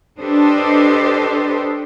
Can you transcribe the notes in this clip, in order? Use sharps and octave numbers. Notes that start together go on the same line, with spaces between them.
D4 G4 A4 B4 C5 D#5